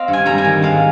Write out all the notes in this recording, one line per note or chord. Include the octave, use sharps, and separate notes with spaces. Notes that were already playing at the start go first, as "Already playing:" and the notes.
Already playing: C4 D#5 F5
G2
G#5
G3 A#5
G#5
D#3
G#2 F5